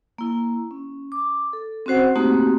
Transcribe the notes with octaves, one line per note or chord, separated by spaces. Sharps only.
A#3 E4
C#4
D6
A4
C4 C#4 F#4 C5 F#5
A3 A#3 C4 D#4 F#4 G4